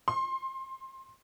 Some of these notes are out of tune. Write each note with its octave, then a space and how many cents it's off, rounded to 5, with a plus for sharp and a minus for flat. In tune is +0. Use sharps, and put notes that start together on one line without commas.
C6 +25